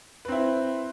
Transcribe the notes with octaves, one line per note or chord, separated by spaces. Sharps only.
C4 E4 B4